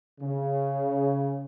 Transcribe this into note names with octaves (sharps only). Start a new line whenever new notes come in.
C#3